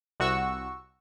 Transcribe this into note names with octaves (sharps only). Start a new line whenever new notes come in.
C2 F#4 C#6 E6